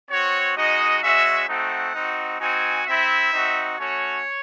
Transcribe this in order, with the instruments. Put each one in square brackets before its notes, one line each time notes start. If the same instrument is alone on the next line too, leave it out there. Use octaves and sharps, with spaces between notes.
[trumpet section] C4 F#4 C#5
G#3 D#4 F#4 D#5
G#3 C#4 F#4 E5
A3 C4 D#4 F#4 F#5
C4 D#4 F#4
C4 D#4 F#4 G#5
C4 E4 E5
C4 D#4 F#4
A3 C#4 F#4 C#5